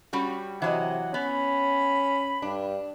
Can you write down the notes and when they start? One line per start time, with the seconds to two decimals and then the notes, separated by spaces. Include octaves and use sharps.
0.13 G3 C#4 F#4
0.62 C3 E3 F#3 D#5 F#5
1.14 B3 C#4 B5
2.42 G2 D4